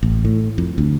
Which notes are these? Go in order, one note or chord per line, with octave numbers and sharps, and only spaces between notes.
A1
A2
F2
D2